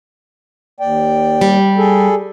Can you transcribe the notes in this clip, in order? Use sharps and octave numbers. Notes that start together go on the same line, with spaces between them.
D#2 D5 G5
G3
G#4 A4